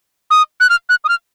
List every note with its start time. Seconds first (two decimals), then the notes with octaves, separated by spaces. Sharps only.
0.31 D#6
0.60 F#6
0.70 F6
0.89 F#6
1.04 D#6
1.09 F6